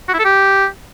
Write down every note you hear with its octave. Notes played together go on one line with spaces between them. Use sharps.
F#4
E4
A4
G4